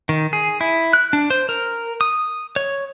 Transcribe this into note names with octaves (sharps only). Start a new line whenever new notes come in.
D#3
G#4
E4
F#6
D4
C5
A#4
D#6
C#5